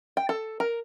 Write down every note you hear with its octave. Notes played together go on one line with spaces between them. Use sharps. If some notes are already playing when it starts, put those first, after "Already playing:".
G5
A4
A#4